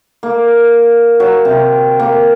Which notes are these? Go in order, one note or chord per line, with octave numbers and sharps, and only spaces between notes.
A#3
F#3
C3
A#3